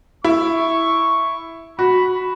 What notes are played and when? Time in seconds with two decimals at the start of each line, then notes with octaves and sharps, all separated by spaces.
0.24 E4 C#6
1.79 F#4 B5